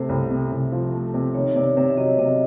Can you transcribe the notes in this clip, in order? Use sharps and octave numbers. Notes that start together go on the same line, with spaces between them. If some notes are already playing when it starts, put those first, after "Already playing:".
Already playing: C3 A3 C5
C2
C3
C2
F3
A3
C3
D#3 C#5
C#5
C3 D5
C3 E5
E5
F#3 D#5
C3 D#5